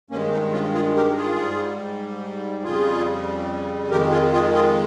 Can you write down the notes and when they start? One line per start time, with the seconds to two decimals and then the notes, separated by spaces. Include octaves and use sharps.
0.10 G2 D#3 G#3 A#3 C#4
0.31 C4 D#4
0.53 C#4 F4
0.74 F4 G#4
0.96 G4 A#4
1.16 F4 G#4
1.38 G#2 G3
2.63 F2 C#3 G3 F4 G#4
3.90 F2 D#3 G#3 G4 A#4
4.11 F4 G#4
4.32 F4 G#4
4.54 F4 G#4